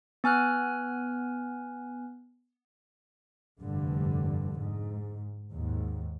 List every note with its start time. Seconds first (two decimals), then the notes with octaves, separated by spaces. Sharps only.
0.24 B3 G#5 F6 F#6
3.61 F1 G2 D3
4.58 G#2
5.52 D#2 G#2